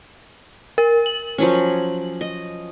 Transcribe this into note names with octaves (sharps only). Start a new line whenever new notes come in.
A#4
F#7
F3 F#3 C#4
D#5